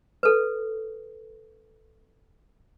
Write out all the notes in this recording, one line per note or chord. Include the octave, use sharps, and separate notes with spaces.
A4 B4